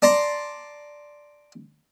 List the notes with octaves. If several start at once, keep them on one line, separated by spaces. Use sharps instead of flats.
D5 A5 A#5 C6